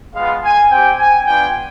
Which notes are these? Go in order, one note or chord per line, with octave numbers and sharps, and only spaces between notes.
G#3 B3 F4 F5
G#5
C4 G4 G5
G#5
B3 D4 F4 G5